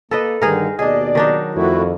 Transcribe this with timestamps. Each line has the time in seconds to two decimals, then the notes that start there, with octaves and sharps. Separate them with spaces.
0.11 A#3 A4 B4 D#5
0.42 G2 D3 D#3 D#4 G#4 A#4
0.79 D#2 B2 D4 G#4 D5 D#5
1.15 D#3 F#3 D4 D#4
1.55 F2 A3 E4 F#4